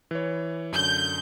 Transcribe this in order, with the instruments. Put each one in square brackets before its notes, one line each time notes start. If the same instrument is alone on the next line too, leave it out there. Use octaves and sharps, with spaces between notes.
[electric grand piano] E3 C#5
[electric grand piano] F#2 D3 [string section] G6